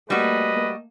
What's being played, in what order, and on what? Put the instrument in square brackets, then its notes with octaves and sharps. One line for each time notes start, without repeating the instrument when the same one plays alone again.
[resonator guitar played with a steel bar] G3 F#4 [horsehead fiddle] A3 A#3 [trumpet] B4 [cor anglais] D#5